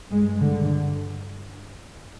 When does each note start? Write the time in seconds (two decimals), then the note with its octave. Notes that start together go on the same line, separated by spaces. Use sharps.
0.10 G2 G#3
0.40 D3